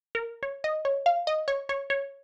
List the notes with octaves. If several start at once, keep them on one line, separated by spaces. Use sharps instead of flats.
A#4
C#5
D#5
C#5
F5
D#5
C#5
C#5
C#5